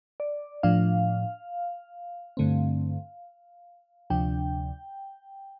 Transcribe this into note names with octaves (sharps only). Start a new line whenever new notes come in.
D5
A2 F3 D4 F5
G2 D3 A3 C4
D2 C3 F3 D4 G5